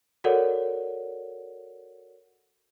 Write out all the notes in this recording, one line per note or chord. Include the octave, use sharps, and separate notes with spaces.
F#4 A4 A#4 C#5 D5 F#5